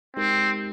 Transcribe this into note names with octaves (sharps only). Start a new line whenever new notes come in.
G#3 C4 D#4 G4 A#4